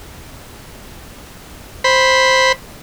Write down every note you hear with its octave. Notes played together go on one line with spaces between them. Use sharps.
C5 B5